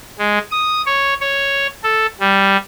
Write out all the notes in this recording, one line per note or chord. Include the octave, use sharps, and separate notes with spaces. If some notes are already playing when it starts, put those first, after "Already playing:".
G#3
D#6
C#5
C#5
A4
G3